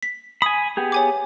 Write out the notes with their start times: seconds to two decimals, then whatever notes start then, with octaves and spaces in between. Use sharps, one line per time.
0.03 B6
0.42 G#5 B5 D#6
0.77 B3 G4 G#4
0.92 C#5 G#5 D6